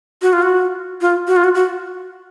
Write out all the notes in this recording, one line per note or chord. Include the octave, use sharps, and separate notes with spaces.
F#4
F4
F#4
F4
F#4
F4
F#4
F#4